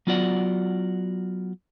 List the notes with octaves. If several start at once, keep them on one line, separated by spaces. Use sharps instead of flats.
F#3 B3 F4 F#4 D5 F#5